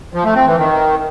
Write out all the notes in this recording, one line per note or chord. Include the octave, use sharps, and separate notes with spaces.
F3
A3
C4
E3
D#3